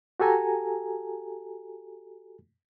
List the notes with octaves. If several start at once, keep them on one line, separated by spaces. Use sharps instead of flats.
F#4 G4 A4 G#5 A#5